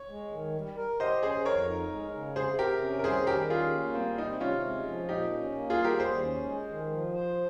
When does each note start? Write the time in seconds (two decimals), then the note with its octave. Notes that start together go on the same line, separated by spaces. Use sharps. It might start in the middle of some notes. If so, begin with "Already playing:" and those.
Already playing: C#5
0.10 G#3
0.32 D#3
0.54 G3
0.77 A#4
1.00 G4 C5 D#5
1.22 C#4 G#4 C5
1.45 F2 A#4 C#5
1.68 D#4
1.91 G#3
2.14 C#3
2.36 C3 G#4 C5
2.59 C3 G4 A#4
2.82 C#4
2.99 A#4
3.04 G3 G#4 C5
3.27 D#3 G4 A#4
3.50 C#4 F4 G#4
3.73 A#3
3.95 G3 C4
4.18 C3 C4 D#4
4.40 C3 C#4 F4
4.64 G#3
4.87 F3
5.09 A#2 D#4 G4
5.32 C#4
5.54 A#3
5.70 F4 G#4
5.78 G3
5.84 G4 A#4
5.99 D#2 G#4 C5
6.23 C#4
6.45 G#3
6.68 D#3
6.90 F3
7.13 C5